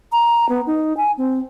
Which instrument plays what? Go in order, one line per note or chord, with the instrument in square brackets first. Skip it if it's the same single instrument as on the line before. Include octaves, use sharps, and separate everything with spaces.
[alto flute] A#5
B3
D#4
G#5
C4